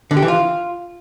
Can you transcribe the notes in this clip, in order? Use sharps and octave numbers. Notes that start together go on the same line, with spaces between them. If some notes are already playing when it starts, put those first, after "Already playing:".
D3
G4
E3
F4